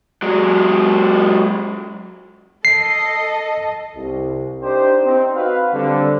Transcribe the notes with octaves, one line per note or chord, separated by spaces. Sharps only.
F#3 G#3
A4 D#5 C7
C2
D4 D#4 G4 C5
C4 D#4
F#4 B4 F5
D3 G3 C4